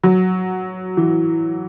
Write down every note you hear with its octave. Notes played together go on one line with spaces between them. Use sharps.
F#3
E3